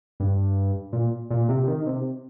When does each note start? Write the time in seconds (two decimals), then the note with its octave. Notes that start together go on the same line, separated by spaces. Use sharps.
0.20 G2
0.93 A#2
1.30 A#2
1.49 C3
1.68 D#3
1.86 C3